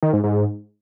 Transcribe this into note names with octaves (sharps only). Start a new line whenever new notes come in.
D#3
G#2
G#2